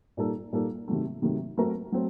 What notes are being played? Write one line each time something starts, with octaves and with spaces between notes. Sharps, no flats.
A#2 G3 A#3 D#4 A4
A#2 G3 A#3 D#4 A4
C3 D#3 F#3 A3
C3 D#3 F#3 A3
F#3 A3 C4 F#4 A#4
F#3 A3 C4